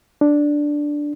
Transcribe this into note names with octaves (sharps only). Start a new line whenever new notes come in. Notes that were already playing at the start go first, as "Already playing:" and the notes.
D4